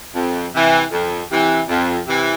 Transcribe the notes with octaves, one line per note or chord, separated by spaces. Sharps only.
F2
C3 E3
F2
C3 E3
F2
C3 E3